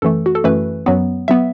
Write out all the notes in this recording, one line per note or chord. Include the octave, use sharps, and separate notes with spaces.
F#2 E3 A3 A4
F#4
A4
F#2 E3 A3 B4
F#2 F#3 B3
F#3 B3 E5